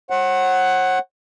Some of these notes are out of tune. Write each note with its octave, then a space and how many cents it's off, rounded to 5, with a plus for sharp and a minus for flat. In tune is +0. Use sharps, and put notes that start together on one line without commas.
C#5 -45 F#5 +10